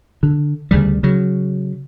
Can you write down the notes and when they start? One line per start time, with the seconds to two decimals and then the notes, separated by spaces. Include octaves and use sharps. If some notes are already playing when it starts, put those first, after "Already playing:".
0.23 D3
0.71 D2 C#3 G3
1.03 C#3 F#3